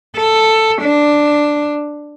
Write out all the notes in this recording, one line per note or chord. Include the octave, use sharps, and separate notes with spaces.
A4
D4